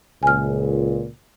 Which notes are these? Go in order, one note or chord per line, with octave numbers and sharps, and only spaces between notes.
C#2 A#2 G#5 F6